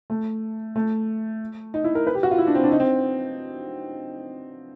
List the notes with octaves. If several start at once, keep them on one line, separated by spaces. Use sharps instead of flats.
A3
A3
D#4
E4
A#4
B4
G4
F#4
F4
E4
D4
C4
D4
D#4
C4